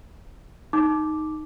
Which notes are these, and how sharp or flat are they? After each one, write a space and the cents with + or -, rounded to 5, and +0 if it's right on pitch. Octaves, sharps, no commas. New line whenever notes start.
D#4 +0 D6 +0